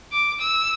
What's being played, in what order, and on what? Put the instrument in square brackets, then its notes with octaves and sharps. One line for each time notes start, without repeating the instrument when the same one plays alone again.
[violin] D6
E6